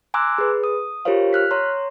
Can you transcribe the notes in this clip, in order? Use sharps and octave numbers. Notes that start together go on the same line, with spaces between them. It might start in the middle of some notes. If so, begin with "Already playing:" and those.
G#5 A#5 C6 D6 E6 F#6
G#4 B4
D#6
F4 G4 A#4 C5 C#5 F5
F6 F#6 B6
C#5 A#5 C6